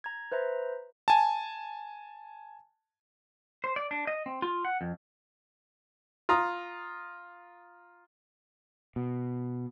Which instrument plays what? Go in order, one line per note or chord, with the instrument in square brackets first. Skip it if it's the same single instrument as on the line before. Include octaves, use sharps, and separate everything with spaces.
[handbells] A#5 G#6
B4 C5 E5 A#5
[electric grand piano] G#5 A5
[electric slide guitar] C5
D5
D4
D#5
C4
F4
F#5
F2
[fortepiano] F4 A#5 D#6
[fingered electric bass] B2